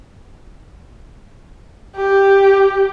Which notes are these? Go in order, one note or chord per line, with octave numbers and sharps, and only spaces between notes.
G4